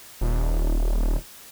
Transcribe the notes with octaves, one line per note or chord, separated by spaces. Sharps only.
D#1